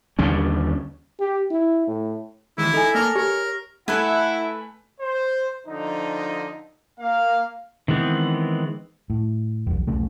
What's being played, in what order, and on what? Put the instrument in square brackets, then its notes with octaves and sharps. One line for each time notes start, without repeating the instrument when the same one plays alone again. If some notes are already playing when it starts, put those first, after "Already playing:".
[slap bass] D#2 D3 G3 C#4
[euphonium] G4
E4
A2
[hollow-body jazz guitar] D#2 E3 G#3 [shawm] E4
[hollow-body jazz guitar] D#4 [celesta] A4 G#5
[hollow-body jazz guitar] A#3 C#5 A5 [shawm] A#4
[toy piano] G4 [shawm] A#4 [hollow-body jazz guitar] C#5
[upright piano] A3 [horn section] E4 [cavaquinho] A4 B4 G#5 [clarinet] F#5
[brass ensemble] C5
D3 F3 D#4
A#3 F5
[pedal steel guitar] D#3 E3 G#3 B3 C4
[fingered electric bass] A2
E1 B1
E1 B1 C#3 A3